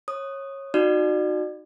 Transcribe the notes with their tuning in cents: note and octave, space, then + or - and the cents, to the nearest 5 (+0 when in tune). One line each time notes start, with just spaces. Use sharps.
C#5 -20 D#6 -5
D#4 +0 F#4 -5 D5 +35